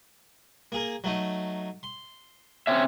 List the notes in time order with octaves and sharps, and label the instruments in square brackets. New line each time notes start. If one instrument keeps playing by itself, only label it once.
[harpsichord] A#3 G#4 A#4
F#3 A3 D#4
C6
[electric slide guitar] C4 C#4 E5